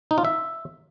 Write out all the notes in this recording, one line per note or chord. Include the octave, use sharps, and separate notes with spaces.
D#4
F4
E5